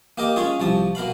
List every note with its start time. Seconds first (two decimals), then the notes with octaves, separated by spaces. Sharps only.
0.18 A#3 G4 A#4 D#5
0.36 G#3 C#4 F4 G#4
0.60 C2 F3 A5
0.95 B2 A#4 F5 B5